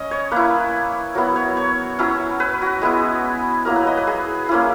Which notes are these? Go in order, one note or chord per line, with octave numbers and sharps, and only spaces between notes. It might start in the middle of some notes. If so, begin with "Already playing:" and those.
Already playing: C#4 D#5
C#5
A#3 E4 B4
F#3 B3 E4 A#4
C#5
C#5
F#3 C#4 E4
B4
F#4
G#3 B3 E4 G#4
F#3 A#3 E4 A#4
B4
D#5
B4
G#4
A#3 C#4 E4